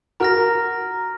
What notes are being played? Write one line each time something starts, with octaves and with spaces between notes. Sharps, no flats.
F#4 A#4 A#5 F6 A#6